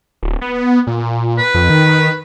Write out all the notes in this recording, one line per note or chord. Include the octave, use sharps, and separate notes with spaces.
D1
B3
A#2
B4
F2
D#3